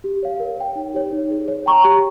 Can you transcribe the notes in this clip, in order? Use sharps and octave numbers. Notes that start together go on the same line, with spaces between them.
G4
C#5 F5
A#4
C#5 G5
D#4
G4 C#5
D#4
G#4 C#5
C#5
G5 A#5 C#6
G4